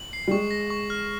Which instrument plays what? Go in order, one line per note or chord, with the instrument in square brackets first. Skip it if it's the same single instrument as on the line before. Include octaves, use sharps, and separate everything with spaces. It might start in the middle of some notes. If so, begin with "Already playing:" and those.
Already playing: [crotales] F#7
C7
[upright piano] G3
[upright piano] G#3 [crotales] C#6
[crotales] A#6
C#6
F6